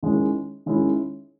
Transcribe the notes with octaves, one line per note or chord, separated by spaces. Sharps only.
D#3 G#3 C#4 E4
D#3 G#3 C#4 E4